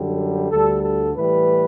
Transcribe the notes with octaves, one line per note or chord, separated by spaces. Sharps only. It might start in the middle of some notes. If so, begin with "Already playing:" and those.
Already playing: F#2 D3 G3
D2 D3 G3 A4
A4
A2 E3 G3 B4